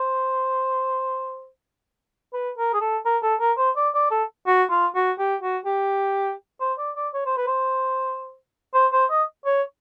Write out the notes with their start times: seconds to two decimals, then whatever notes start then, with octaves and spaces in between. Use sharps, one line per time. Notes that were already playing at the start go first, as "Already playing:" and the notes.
Already playing: C5
2.33 B4
2.58 A#4
2.73 G#4
2.81 A4
3.05 A#4
3.23 A4
3.40 A#4
3.57 C5
3.76 D5
3.94 D5
4.11 A4
4.47 F#4
4.70 F4
4.95 F#4
5.19 G4
5.42 F#4
5.66 G4
6.61 C5
6.78 D5
6.96 D5
7.14 C#5
7.26 C5
7.37 B4
7.47 C5
8.74 C5
8.93 C5
9.10 D#5
9.45 C#5